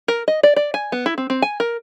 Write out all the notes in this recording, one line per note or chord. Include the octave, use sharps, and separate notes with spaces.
A#4
D#5
D5
D5
G#5
B3
E4
C4
C4
G#5
A#4